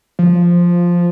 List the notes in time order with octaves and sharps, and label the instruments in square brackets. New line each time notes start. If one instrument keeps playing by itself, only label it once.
[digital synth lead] F3